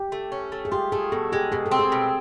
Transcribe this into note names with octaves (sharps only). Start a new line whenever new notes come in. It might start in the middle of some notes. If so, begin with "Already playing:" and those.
Already playing: G4
A3
C#4
A3
G#4
F4 G4
A3 G#4
B2 A4
G#3 G4
B2 G#4
A4
C4
G#4
B2